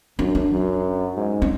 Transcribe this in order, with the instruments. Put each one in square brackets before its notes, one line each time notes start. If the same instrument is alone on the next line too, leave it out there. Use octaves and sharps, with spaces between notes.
[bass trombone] F#2 [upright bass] D4
[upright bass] D4
[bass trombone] F#2
G#2
[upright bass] C#4